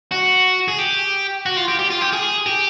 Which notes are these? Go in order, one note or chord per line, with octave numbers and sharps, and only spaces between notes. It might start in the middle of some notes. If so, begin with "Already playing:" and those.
F#4
G#4
G4
F#4
F4
G4
G4
F4
G4
G#4
G4